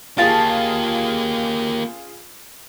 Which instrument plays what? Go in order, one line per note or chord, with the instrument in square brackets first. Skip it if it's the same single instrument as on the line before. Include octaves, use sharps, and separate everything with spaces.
[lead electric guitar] A#3 G4 [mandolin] C#4 A5 [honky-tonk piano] F4 G#4